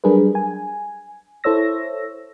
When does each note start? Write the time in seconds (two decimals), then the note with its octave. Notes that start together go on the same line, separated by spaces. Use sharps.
0.04 F#3 G3 D4 G#4 A#4 B4
0.35 G#5
1.44 E4 A4 C5 C#5 E6 A#6